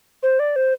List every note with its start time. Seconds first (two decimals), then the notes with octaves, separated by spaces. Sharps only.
0.23 C5
0.39 D5
0.56 C5